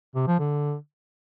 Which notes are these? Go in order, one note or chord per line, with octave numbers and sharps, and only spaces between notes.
C3
F3
D3